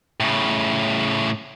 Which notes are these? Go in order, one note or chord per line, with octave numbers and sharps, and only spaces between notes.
A2 C#3